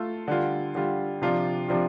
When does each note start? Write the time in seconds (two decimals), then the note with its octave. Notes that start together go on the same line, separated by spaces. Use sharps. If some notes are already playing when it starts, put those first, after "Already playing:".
Already playing: A3 F4 A4
0.28 D3 G3 F4
0.75 D3 G3 F4
1.22 C3 F3 D4 F4
1.68 C3 F3 D4 F4